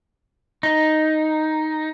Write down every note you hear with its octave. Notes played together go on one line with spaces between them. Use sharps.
D#4